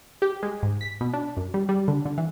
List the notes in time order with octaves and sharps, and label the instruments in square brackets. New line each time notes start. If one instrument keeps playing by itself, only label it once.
[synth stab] G4
G#3
G#2
B6
B2
D4
F#2
G3
G3
D3
D3
E3